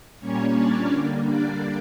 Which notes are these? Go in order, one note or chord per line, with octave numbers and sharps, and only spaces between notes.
A#2 G3 A#3 C#4 C#5
D4 D5
D3 G3 A#3
D4 D5